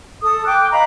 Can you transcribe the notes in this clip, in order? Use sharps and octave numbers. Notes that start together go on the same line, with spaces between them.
A4 D#6
G5 D6 F#6
D#5 F5 A#5 B5